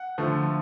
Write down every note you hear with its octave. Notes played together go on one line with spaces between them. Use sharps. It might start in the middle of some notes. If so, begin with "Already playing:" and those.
Already playing: F#5
D3 F3 A3